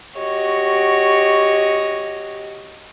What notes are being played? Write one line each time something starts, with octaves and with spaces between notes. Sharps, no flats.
F#4 G4 C#5 D#5